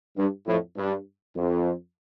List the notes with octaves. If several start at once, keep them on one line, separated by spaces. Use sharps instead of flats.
G2
F2 A2
G2
F2